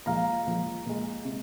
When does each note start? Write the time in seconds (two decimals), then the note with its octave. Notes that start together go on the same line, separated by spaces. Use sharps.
0.06 A#2 F3 G#3 F5 A#5
0.47 A#2 F3 G#3
0.86 A#2 G#3
1.25 C3 G#3